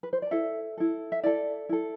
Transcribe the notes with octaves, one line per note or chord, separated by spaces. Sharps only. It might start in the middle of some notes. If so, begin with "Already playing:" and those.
B4
C5
D5
E4 A4 E5
E4 A4
E5
E4 A4 D5
E4 A4